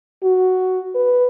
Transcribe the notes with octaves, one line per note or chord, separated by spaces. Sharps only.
F#4
B4